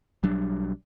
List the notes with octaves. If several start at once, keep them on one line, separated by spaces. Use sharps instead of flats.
B1 F#3 G3 D4